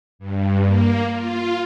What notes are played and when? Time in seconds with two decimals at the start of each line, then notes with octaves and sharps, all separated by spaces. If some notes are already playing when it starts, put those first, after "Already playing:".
0.19 G2
0.64 A#3
1.12 F4